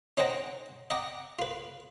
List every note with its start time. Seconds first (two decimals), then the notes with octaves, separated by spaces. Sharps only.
0.17 C#4 D#4 C5 F#5 G5 A#5
0.90 D#5 F#5 G5 A#5 D6
1.39 F4 B4